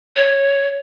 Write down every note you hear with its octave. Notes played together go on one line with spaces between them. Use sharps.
C#5